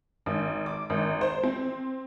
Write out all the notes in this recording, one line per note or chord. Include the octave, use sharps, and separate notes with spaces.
G#1
D6
G#1
C5
C4